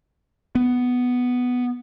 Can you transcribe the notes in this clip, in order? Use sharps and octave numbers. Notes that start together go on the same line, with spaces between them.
B3